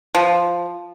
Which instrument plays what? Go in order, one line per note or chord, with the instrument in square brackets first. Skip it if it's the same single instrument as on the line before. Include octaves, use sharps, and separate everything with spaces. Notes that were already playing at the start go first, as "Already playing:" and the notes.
[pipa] F3